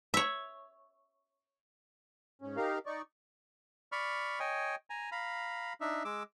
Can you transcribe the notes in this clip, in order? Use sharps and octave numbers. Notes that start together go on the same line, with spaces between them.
C#5 E5
G#2 C#4
D#4 G4 A#4 F5
D#4 D5 C#6
D5 B5 C#6 F6
C#5 D#5 G5 G#5
G#5 A#5
F5 A#5 B5
D4 D#4 E5
G#3 D6 E6